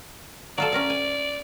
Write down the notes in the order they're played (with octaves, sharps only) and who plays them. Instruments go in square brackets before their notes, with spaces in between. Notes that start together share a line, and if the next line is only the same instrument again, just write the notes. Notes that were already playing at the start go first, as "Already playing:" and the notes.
[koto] F#3 F4 A4 [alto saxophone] D5
[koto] C#4 A#4 F5
G#5